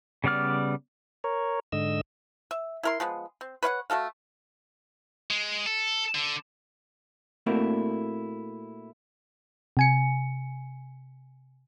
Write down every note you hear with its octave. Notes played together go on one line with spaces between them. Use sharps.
C#3 G3 B3 D5 F6
A#4 C#5
G#2 D3 D#5 E6
E5
E4 A#4 C6
F3 G#3 B3
C4
B4 C#5 F5 F#5
A3 F#4 A4 F5
G#3
A4
D3
A#2 A3 A#3 C4 E4 F#4
C3 G#5 C#7